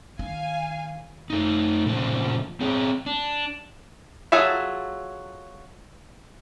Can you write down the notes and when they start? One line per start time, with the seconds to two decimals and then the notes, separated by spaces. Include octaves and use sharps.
0.19 D#3 F5 G#5
1.30 A3 D#4
1.86 A#2 C#3 F3 D4 C5
2.60 C4 G#4 C#5 G5
3.06 D4
4.32 F#3 F4 G#4 A4 E5